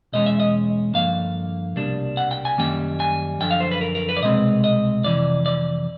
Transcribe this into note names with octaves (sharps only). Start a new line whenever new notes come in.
E2 B2 G#3 C#4 D#5
E5
D#5
G2 D3 F3 A#3 F5
C2 B2 G3 A#3 D4
F#5
G5
G#5
F#2 D#3 G3 A#3 C#4 G5
G#5
F#2 D3 F3 G5
F5
C5
B4
A#4
A#4
B4
D5
C2 B2 G#3 C4 D#5
D#5
F2 C3 E3 D5
D5